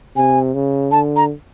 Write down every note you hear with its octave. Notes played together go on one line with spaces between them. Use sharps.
C3 G#5
C#3
D3 A5
A#5